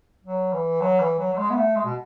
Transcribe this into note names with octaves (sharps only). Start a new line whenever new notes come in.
F#3
E3
F#3
E3
F#3
F#3
G#3
B3
A3
G#3
B2